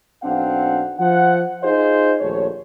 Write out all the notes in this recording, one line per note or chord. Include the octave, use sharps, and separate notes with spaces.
B1 C4 D4 F5 F#5
F3 F#5
D#4 F4 G#4 C5 D#5
A#1 D#2 A3 C#5